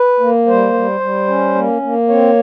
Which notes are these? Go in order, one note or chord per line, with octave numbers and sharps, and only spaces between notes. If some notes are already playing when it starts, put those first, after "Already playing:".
Already playing: B4
A#3
G3 C5
G3
G3
C#4
A#3
A#3
C4 C#5